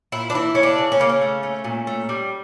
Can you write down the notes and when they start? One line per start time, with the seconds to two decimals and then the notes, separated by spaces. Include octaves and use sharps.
0.12 A#2 E4
0.30 D4
0.34 E3 E4
0.55 C#3 C#4
0.63 D4
0.78 C#3
0.92 C#4
0.99 C#3 A#3
1.09 C#4
1.22 A3
1.43 A3
1.64 A#2
1.87 A3
2.09 G3